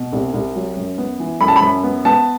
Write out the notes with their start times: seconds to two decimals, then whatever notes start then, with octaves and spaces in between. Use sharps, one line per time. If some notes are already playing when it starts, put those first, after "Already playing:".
Already playing: B2
0.13 C2
0.34 C2
0.55 F#3
0.77 F#2
0.98 B3
1.20 E3
1.41 F#2 B5
1.48 A5
1.56 B5
1.62 F#2
1.84 B3
2.05 B3 A5